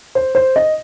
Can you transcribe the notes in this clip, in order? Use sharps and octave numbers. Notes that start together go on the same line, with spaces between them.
C5
C5
D#5